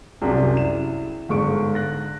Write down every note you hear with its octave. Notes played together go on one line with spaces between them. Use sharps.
C2 F#2 C3 D4 F#4 G#4
E4 E7
G1 G#2 G#3 C#6 D7
F#6 A#6